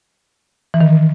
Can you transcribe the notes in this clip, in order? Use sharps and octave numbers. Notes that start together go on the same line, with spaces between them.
E3
D#3